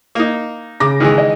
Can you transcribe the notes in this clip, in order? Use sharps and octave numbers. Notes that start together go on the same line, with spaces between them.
A#3 D#4
C#3 D6 A#6
D#3 E3 G#3
D#5